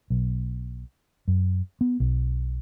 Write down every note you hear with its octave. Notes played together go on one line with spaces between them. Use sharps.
B1
F#2
B3
B1